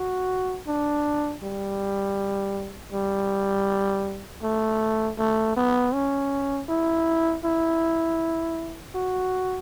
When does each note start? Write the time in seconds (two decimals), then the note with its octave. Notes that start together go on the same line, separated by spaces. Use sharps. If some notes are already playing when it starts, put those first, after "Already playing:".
Already playing: F#4
0.67 D4
1.43 G3
2.92 G3
4.43 A3
5.19 A3
5.57 B3
5.94 C#4
6.69 E4
7.44 E4
8.95 F#4